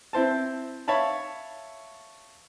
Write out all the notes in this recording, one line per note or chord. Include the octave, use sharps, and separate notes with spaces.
C4 E4 C5 A5
C#5 E5 F5 A5 B5